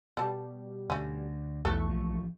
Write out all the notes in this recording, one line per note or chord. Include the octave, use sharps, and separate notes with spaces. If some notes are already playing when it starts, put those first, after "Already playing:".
B2 G3 A4 A5
D2 D3 A3 C#4
B1 E2 E3 A3 A4 B4 C#6
A1 F3